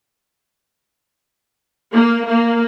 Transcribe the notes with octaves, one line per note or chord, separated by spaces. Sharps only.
A#3
A#3